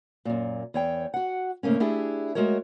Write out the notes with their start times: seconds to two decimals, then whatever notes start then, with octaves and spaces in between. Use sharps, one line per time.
0.25 F#2 A#2
0.74 E2 C#5 G5
1.14 F#4 F#5
1.63 G#2 C#3 A3 A#3 C#4
1.80 A3 D4 E4 G4 G#4 E5
2.35 G#3 A3 F#4 A#4 C#5